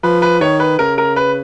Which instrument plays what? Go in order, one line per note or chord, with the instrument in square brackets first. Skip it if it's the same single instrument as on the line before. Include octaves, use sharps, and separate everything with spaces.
[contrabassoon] F3 [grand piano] B4
[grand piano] B4
[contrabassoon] D#3 [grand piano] C#5
[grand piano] B4
[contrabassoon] C#3 [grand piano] A#4
[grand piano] A#4
B4